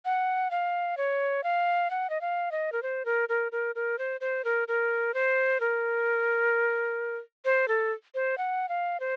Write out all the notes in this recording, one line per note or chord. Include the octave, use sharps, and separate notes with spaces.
F#5
F5
C#5
F5
F#5
D#5
F5
D#5
A#4
C5
A#4
A#4
A#4
A#4
C5
C5
A#4
A#4
C5
A#4
C5
A4
C5
F#5
F5
C5